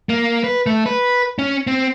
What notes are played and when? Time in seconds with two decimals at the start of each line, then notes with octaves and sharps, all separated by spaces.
0.09 A#3
0.44 B4
0.66 A3
0.86 B4
1.39 C#4
1.67 C4